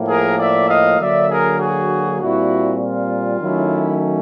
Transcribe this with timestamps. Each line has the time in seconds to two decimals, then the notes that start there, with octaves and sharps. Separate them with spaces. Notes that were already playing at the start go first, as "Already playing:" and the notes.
Already playing: A2 F3 A#3
0.09 G#4 A#4
0.39 D5 E5
0.69 D#5 F5
0.99 D3 F#3 A#3 D4 D5 E5
1.30 G#4 A#4
1.59 F#4 G#4
2.20 A#2 G3 C4 E4 F#4
2.81 F4
3.41 D#3 F#3 A3 C#4 E4